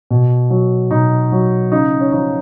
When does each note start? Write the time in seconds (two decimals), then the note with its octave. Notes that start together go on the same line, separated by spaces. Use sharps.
0.11 B2
0.50 F#3
0.91 B2 D#4
1.32 F#3
1.72 C#3 D#4
2.00 C#4
2.12 F3 D#4